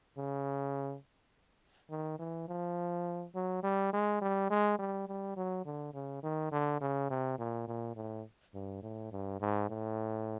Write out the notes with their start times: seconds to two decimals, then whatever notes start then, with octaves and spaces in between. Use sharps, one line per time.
0.18 C#3
1.90 D#3
2.19 E3
2.48 F3
3.35 F#3
3.63 G3
3.93 G#3
4.21 G3
4.50 G#3
4.79 G3
5.08 G3
5.37 F#3
5.66 D3
5.94 C#3
6.23 D#3
6.52 D3
6.81 C#3
7.10 C3
7.39 A#2
7.68 A#2
7.96 A2
8.54 G2
8.83 A2
9.12 G2
9.41 G#2
9.69 A2